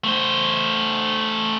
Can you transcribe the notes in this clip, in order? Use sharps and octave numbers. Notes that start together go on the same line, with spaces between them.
A3 C5